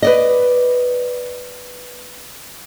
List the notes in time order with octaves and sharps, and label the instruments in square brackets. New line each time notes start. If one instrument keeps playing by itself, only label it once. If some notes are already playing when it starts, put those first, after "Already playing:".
[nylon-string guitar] B4 D5 D#5